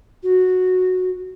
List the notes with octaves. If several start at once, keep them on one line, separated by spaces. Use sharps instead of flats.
F#4